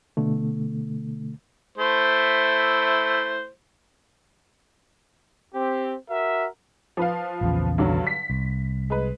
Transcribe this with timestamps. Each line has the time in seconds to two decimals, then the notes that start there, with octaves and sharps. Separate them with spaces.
0.17 B2 D3 A3
1.78 A3 E4 C5
5.54 C4 G4
6.09 F#4 A#4 E5
6.97 F3 B4 F5
7.41 A#1 E2 C#3
7.78 G2 D3 F#3
8.07 B6
8.30 C2
8.90 G#3 B4